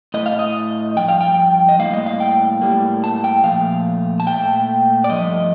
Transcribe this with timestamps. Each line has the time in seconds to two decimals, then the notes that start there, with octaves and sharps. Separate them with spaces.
0.14 A2 A3 D#5
0.26 F5
0.39 D#5
0.97 G2 F3 G5
1.08 F5
1.21 G5
1.69 D#5
1.79 A2 G3 A#3 F5
1.93 D#5
2.06 F5
2.20 G5
2.62 A2 G3 A#3
3.04 A5
3.24 G5
3.44 A#2 F3 A3 F5
4.20 A5
4.27 A#2 A3 G5
5.04 D5
5.09 G2 F3 A3 D#5